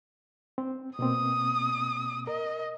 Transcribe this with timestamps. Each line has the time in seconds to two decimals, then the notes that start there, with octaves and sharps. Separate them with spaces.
0.58 C4
0.99 B2 A#3 C4 D#6
2.27 A#4 D#5